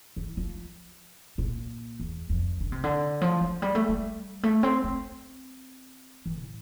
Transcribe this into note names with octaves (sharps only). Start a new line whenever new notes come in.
E3
F3
A#2
E2
F2
D3
C3
D3
F3
F3
G3
A3
G3
A3
C4
C4
E3
A2